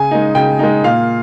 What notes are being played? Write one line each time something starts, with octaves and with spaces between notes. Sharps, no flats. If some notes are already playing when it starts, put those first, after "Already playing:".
Already playing: C#3 G#5
G#3 D#4
C#3 G5
G#3 D#4
A#2 F5